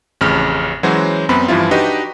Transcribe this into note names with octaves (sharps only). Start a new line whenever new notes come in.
A1 F2 C#3 F6
E3 F#3 G#3 C#4 F#4 C5
F#2 B3 C4 B5
G2 E3 F3 E4 F4
D4 D#4 F#4 G4 B4 D#5